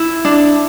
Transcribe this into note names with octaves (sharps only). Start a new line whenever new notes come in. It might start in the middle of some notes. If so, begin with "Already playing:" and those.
Already playing: E4
D4